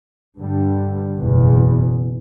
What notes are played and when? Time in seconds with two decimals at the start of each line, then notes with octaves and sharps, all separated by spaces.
0.39 G2 D3 G3
1.18 F#1 E2 B2